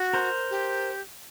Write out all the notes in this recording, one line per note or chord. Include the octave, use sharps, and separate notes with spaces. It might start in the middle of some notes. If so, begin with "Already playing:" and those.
Already playing: F#4
A#4 C5
G4